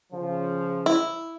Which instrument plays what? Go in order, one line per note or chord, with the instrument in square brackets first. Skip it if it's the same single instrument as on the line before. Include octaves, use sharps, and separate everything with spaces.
[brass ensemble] C#3 F3
[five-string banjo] E4